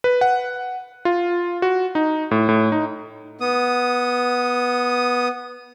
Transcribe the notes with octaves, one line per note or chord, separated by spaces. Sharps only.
B4
F#5
F4
F#4
D#4
A2
A2
D#4
B3 D#6